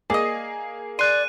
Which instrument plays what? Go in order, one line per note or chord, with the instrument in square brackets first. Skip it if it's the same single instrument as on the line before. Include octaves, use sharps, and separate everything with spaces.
[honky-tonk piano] A#3 G#4 [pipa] D5 D#5
[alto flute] D5 [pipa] C6 [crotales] F#6 D#7